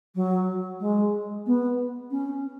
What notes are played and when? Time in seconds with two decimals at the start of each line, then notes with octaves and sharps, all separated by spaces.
0.15 F#3
0.80 G#3
1.46 B3
2.11 C#4